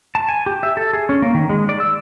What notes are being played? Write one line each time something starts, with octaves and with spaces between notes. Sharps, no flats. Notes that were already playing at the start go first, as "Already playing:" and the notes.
A5
G#5
G4
E5
A4
G#4
C#4
A#3
D#3
G#3
D5
E6